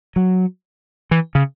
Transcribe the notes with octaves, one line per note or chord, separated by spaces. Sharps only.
F#3
E3
C#3